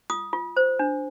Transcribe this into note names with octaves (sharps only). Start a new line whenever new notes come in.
F4 D#6
F4
C5
D4